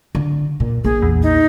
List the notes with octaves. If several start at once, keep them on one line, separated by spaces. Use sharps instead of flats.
D3
A#2
A#1 G#4
E2
D#4